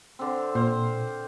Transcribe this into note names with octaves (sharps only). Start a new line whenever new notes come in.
D3 C4
A#2 C5 F5